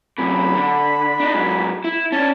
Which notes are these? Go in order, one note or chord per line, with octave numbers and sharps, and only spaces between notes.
F#2 C3 B5
D3
D4 D#4
G#2 F#3
E4
C#4 D4 A5